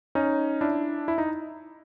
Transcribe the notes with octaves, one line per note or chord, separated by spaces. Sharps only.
C#4 D#4
D4 E4
E4
D#4